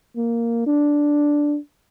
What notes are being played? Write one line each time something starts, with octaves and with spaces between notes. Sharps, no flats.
A#3
D4